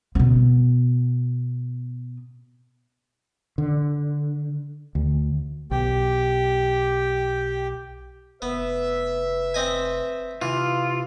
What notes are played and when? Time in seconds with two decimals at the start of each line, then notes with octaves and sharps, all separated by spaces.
0.15 B2 B3
3.58 D3
4.95 D2
5.71 B1 G4 G5
8.42 F1 B3 B4 E5
9.54 C4 D#5 G#5
10.42 C3 E3 F4